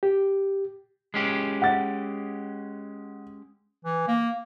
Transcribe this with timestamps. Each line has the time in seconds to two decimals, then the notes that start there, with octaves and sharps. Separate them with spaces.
0.03 G4
1.14 G#3 C#4 G4
1.62 F#5 A6
3.85 E3
4.07 A#3